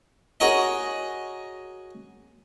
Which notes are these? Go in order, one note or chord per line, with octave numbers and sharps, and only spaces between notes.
F#4 G#4 A#4 C#5 D#5